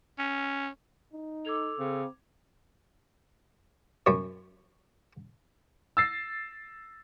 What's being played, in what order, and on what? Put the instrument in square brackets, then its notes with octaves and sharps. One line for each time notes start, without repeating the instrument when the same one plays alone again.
[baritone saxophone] C#4
[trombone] D#4
[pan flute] A4 [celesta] D6 G#6 F7
[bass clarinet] C#3 [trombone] C4
[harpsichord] F#2 C#5
[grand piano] E6 A6 C7